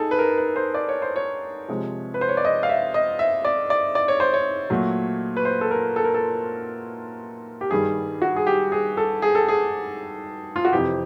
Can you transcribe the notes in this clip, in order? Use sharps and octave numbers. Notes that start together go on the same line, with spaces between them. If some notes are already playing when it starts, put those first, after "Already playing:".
Already playing: D#4 G#4 A4
B4
A#4
B4
C5
D5
C#5
C5
C#5
C3 F3 G#3
B4
C5
C#5
D5
D#5
F5
E5
D#5
E5
D5
D5
D5
C#5
C5
C#5
A#2 F#3 A3
B4
C5
A4
A#4
A4
A#4
A4
G4
G2 D#3 G3 G#4
F#4
G#4
G4
G#4
A4
G#4
A4
G#4
F4
F#4
F2 C3 E3 G4